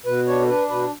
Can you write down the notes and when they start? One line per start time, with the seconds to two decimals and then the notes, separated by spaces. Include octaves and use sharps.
0.06 B2 B4
0.27 D4 C#5
0.41 A4
0.48 D4 B4
0.69 B2 B4